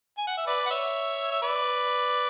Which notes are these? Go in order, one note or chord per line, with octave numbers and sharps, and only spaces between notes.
G#5
F#5
E5
B4 D5
F#5
C#5 E5
E5
B4 D5